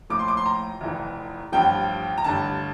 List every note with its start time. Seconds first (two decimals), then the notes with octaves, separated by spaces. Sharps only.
0.10 A#1 A2 F3 D6
0.19 C6
0.28 D6
0.37 C6
0.46 A#5
0.81 F1 F2 E3
1.52 A1 G2 F3 G5
2.18 A#5
2.24 A1 G2 D3 A5